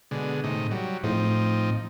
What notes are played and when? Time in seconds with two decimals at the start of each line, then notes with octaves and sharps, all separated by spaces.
0.11 B2 D3 G#3
0.44 A2 C3 D#4
0.71 F#3 G3
1.04 A2 F3 C4 D#4